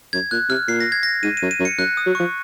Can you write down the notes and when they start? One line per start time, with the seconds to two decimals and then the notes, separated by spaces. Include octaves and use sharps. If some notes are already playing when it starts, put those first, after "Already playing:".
0.13 F#2 G#6
0.31 A#2 F#6
0.50 C3 F6
0.68 A#2 C7
0.80 A#6
0.92 G#6
1.03 A#6
1.23 G#2 D#7
1.37 D#7
1.42 F#2
1.51 D#7
1.60 F#2
1.65 C#7
1.78 F#2 F#6
1.97 D#6
2.06 F#3
2.15 F3 C#6